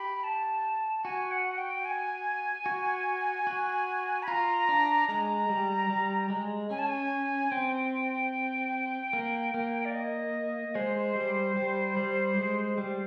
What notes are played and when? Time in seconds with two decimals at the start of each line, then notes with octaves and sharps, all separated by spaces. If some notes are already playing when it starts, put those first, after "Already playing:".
Already playing: G4 B5
0.24 A5
1.04 F#4 G#5
1.31 F#5
1.58 G5
1.85 G#5
2.66 F#4
3.47 F#4
4.23 B5
4.28 F4 A#5
4.69 D4
5.08 G#3 A#5
5.49 G3
5.90 G3
6.30 G#3
6.70 C#4 G#5
6.79 A5
6.87 G#5
7.51 C4 G5
9.13 A#3
9.54 A#3
9.85 D5
9.94 D#5
10.75 G#3 C5
11.16 G3
11.56 G3
11.97 G3
12.37 G#3
12.78 G3